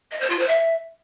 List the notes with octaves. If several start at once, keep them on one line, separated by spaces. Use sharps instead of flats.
D#5
C5
F4
C5
E5